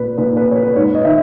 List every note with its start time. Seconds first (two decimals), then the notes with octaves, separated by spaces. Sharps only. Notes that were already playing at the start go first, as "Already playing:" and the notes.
Already playing: A#2 B4
0.18 A#2 B4
0.37 B4
0.51 C#5
0.56 B4
0.67 B4
0.75 G#2 C#5
0.95 D#5
1.04 D#3 E5